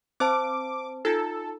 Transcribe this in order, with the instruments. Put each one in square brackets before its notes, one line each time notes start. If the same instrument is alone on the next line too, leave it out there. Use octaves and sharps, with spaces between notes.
[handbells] C4 C5 A5 [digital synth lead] D6
[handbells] D#4 F4 [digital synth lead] A4